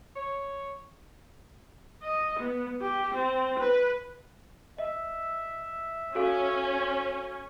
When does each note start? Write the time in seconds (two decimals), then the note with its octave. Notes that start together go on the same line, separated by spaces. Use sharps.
0.14 C#5
2.03 D#5
2.39 B3
2.81 G4
3.14 C4
3.59 B4
4.78 D#5 E5
6.15 C#4 F#4 A4 F5